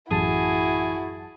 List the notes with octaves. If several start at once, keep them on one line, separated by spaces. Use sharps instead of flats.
A1 F#2 E4 F#4 G#4 A5 A6